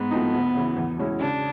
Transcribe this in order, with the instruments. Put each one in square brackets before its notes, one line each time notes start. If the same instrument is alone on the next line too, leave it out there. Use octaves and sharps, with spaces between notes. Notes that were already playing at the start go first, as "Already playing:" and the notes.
Already playing: [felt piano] G#2 [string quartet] B3
[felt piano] F3 A3 C4 D#4
D2
C#3 E3
E2
B2 G#3 C#4 E4
[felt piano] C#3 [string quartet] D4